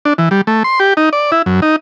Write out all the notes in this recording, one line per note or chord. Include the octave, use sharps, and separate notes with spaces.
D4
E3
G3
A3
C6
G4
D#4
D5
E4
F#2
D#4